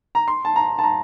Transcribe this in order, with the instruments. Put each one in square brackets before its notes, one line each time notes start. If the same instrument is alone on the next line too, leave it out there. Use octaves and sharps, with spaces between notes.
[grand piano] A#5
C6
A5
A#5
A5
A#5